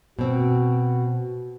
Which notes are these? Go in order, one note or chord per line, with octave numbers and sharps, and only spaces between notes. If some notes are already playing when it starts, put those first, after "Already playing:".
B2 C4 F#4